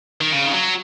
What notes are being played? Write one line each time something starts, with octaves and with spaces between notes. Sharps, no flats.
D#3
C#3
D#3
F#3